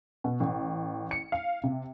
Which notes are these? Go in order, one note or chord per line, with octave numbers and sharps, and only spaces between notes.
B2
A1
C#7
F5
C3